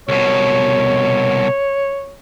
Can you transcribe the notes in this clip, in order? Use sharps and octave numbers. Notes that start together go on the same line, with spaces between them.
C2 B2 C#5